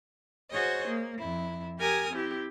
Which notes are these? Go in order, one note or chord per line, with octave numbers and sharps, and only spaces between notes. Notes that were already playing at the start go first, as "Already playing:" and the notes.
F#4 G#4 C5 C#5 D#5
A#3
F2 E4
G4 A#4 G#5 D#6 F6
C4 E4 G4